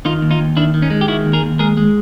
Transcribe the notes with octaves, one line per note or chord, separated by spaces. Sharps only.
D#3 D#4 F4
D#2
D#4 F4
D#2
D#3 D4 E4
D#3
C#4 D#4
G#3
G4
D#3 E4 F#4
D#2
G#4 A#4
D#2
G#3 G#4 A#4
G#3